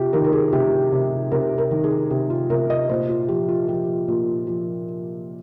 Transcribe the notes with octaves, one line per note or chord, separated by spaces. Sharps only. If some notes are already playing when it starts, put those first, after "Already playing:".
Already playing: C3 F4 G4
D#3 A#4
A#4
G#4
C3 G4
C3
C3 A#4
A#4
D#3
G#4
C3 G4
F4
C3 A#4
D#5
A#2 C5
F4
F3 G4
F4
F3 G4
A#2
F3